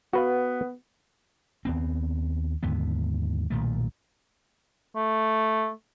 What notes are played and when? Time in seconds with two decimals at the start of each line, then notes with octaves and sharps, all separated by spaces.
0.13 B3 F#4 B4 F5
1.65 D#2 B3 C4
2.63 D#2 G#2 D3 B3
3.50 B1 A#2 D#3 A3
4.96 A3